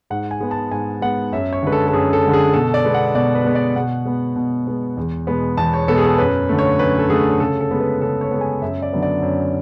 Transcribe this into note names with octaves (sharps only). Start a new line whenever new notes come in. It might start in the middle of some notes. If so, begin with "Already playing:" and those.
G#2 F#5
G#5
G#3 B3
A5
G#2 G#5
G#3 B3 F#5
F#2 E5
C#5
D3 G#3 B4
A4
A4
F#2 G#4
A4
D3 G#3
G#4
B2 A4
D5
G#3 B3
F#5
B2 D5
B4
G#3 B3
D5
B2 F#5
G#3 B3
B2
G#3 B3
E2
B2 G#3 B3
E2 A5
C#5
B2 G#3 B3 A4
G#4
A4
F#2 B4
D3 A3
C#5
F#2 B4
A4
D3 A3 G#4
C#3 A4
A4
G#3 B3
B4
C#3 A4
C#5
G#3 B3
G#5
F#2 E5
D5
D3 F#3 B3
D5
F#2